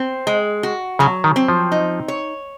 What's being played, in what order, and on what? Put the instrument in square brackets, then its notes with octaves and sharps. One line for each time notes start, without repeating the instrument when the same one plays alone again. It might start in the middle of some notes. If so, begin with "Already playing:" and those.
Already playing: [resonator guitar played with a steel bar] C4
G#3
F#4
[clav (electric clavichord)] C#3 [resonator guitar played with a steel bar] F#3
[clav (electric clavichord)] D#3
[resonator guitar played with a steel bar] C4
[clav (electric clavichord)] F3
[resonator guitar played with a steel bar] D#4
C#5